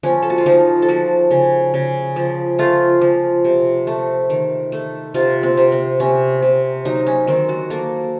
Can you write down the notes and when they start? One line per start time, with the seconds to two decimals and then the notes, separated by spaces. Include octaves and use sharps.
0.03 F3 C#4
0.22 A4
0.30 F#4
0.38 F4
0.46 F3 D#4
0.82 A4
0.88 F3 F#4
1.31 C#3
1.74 C#3
2.16 F3
2.59 A3 F4
3.01 F3
3.44 C3
3.87 A3
4.30 D#3
4.72 A3
5.14 C3 F4
5.43 C4
5.57 C3
5.72 C4
6.00 C3 C#4
6.42 C3
6.85 F#3 D#4
7.07 C#4
7.27 D#3 C4
7.49 F#4
7.70 A#3 A4